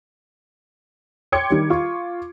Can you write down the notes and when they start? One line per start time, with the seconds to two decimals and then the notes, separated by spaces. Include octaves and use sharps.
1.32 C#5 G5 C6 D6 G#6 C#7
1.50 D#3 G3
1.70 F4 C#6